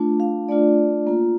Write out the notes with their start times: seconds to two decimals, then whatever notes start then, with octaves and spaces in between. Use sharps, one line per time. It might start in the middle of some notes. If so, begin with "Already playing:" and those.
Already playing: A3 D4 F4
0.20 F5
0.49 A3 D4 F4 D5
1.07 A#3 F4